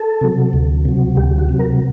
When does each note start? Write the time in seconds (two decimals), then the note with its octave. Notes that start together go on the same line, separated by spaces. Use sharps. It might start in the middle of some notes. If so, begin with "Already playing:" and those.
Already playing: A4
0.21 C3 F#3
0.53 D2
0.85 C3 F#3
1.16 D2 G4
1.38 F#4
1.49 C3 F#3
1.59 A#4